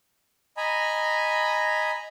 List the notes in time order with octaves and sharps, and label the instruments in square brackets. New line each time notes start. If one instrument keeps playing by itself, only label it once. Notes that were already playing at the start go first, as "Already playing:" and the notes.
[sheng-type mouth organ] D#5 G#5 A#5 B5